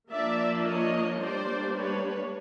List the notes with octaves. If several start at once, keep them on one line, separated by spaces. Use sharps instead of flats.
F3 A#3 D4 D5 E5
C#5 D#5
G3 A#3 D4 C5 D5
B4 C#5